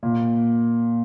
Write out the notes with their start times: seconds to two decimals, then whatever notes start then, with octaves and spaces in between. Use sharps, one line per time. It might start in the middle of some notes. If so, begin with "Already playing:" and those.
0.03 A#2